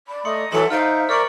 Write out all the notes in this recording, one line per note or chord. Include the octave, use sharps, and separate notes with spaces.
D5 B5
A3 D#5 A#5 C6 D#6 C#7
E3 F#3 A4 E5 C6 C#7
D#4 C5 E5 F5 F6 D7
A#4 D5 C#6 F6 C#7 F#7